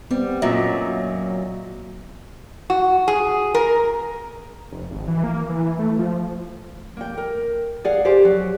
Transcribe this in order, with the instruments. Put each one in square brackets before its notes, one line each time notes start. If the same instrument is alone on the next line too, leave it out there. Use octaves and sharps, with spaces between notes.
[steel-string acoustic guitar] G3 [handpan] B3 C4
[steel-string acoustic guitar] F#2 A#2 F#3 [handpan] F#4 D#5 E5
[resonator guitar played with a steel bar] F#4
G#4
A#4
[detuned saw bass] F1
G#1
E3
A#3
E3
A3
F3
[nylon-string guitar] A#3 G5
A#4
G#4 D5 F5 F#5
G4 G#4 C5 D5
F#3